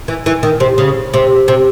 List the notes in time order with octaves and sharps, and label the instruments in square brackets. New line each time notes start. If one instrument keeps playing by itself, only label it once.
[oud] E3
E3
D#3
C3
C#3
C3
C3